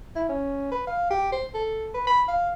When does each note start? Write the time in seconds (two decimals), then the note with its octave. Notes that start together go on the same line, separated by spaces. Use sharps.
0.16 E4
0.29 C#4
0.72 B4
0.87 F5
1.10 G4
1.32 C5
1.54 A4
1.94 B4
2.07 B5
2.28 F5